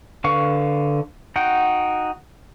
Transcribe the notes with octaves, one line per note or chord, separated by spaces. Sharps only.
D3 B4 F5 C#6
D#4 F#4 F#5 G5